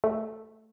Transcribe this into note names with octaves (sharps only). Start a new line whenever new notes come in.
A3